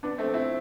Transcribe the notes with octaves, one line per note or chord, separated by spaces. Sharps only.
B3 D4
A3 C4
C4 E4